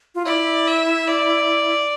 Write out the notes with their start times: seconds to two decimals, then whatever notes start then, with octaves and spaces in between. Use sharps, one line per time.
0.15 F4
0.25 E4 D5
0.67 E5
1.08 D5